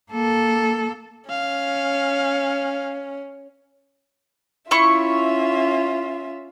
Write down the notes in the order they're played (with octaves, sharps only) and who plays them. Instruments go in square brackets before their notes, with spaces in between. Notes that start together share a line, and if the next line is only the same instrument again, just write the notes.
[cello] A#3 A4
[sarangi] C#4 [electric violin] F5
[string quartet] C#4 F4 E5 [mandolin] E4 C#6